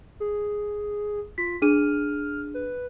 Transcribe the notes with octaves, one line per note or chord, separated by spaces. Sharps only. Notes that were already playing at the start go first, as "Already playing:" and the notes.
G#4
F4 B6
D4 G#4 F6 D#7
B4